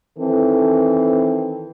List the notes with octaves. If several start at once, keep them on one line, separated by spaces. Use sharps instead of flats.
D#3 E3 C4 A4